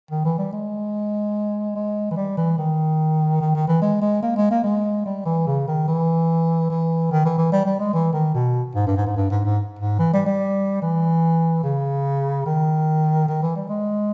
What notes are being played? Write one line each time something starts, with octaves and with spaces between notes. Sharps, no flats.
D#3
E3
G3
G#3
G#3
E3
G3
E3
D#3
D#3
D#3
E3
G#3
G#3
A#3
G#3
A#3
G#3
G3
E3
C#3
D#3
E3
E3
D#3
E3
E3
G3
G3
G#3
E3
D#3
B2
G#2
G2
G#2
G#2
G2
G#2
G#2
G#2
E3
G3
G3
E3
C#3
D#3
D#3
E3
G3
G#3